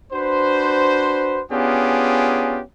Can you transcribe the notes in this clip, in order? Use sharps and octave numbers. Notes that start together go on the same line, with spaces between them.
D4 F#4 B4 C5
B3 C#4 D4 F4 G4 G#4